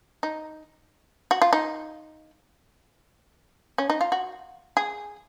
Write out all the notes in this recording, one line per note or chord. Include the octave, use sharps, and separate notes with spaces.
D#4
F#4
F4
D#4
C#4
D#4
F4
F#4
G#4